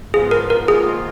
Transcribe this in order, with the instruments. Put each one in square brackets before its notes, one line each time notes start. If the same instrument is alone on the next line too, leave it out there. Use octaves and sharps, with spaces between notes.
[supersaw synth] G#2 F3 B3 F4 [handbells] G#4
[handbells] A#4
A#4
[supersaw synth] G#2 D#3 A#3 F4 [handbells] G#4